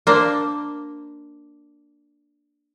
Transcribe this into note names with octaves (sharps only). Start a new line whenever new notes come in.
A#3 D4 C5